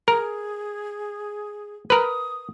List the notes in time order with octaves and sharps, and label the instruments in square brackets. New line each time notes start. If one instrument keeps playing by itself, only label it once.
[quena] G#4 [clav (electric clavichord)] A#4
[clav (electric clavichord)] A#4 B4 [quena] D#6